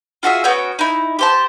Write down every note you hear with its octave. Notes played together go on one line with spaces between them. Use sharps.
F4 F#4 G#4 E5
B3 C#4 F#4 G5
D#4 E4
G4 C5 A5